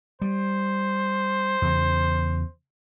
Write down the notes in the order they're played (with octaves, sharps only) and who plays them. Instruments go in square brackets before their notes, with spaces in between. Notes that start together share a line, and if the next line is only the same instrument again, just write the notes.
[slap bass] G3 [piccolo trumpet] C5
[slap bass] E2 C#3